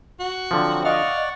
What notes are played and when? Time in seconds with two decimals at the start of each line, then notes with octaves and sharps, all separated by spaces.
0.20 F#4
0.51 D3 F3 F#3 C4
0.85 D5 D#5 F5 F#5 C#6